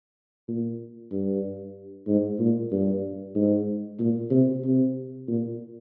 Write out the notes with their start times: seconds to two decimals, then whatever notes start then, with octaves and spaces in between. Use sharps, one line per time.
0.48 A#2
1.12 G2
2.08 G#2
2.39 A#2
2.72 G2
3.35 G#2
4.00 A#2
4.31 C3
4.64 C3
5.28 A#2